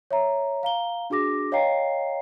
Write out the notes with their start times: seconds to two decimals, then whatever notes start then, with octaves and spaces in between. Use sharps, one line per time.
0.11 C#5 E5 A#5
0.63 F5 A#5 G7
1.10 D4 F#4 G#4 D6 A#6
1.52 C#5 D#5 F5 G5 A#5 C7